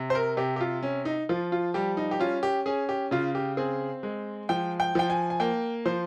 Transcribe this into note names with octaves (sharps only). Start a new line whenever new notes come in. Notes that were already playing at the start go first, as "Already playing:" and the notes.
Already playing: C3
C5
A#4
C3 G4
G4
F4
C#4
D#4
F3 F4
F4
G3 G4
D#4
G4
C#4 F4
G4
C#4 G#4
G4
C#3 F4
G4
C4 G#4
G#3
F3 G5
G5
F3 G5
G#5
G#5
A#3 G5
F3 C5